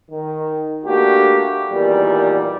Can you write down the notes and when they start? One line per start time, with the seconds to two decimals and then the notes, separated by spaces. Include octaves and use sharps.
0.11 D#3
0.84 A3 A#3 D4 F#4 G4
1.71 E2 A#2 D#3 G3